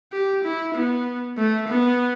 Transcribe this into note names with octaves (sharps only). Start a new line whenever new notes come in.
G4
E4
B3
A3
B3